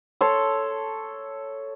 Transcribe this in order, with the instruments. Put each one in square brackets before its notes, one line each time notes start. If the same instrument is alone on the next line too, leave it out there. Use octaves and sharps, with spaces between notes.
[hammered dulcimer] A4 C#5 A5 C6